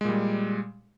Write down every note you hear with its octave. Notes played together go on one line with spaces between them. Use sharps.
A#2 G3 G#3